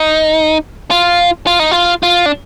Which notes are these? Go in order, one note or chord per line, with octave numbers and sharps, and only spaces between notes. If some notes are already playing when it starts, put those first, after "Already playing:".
Already playing: D#4
F4
F4
D#4
F4
F4
D4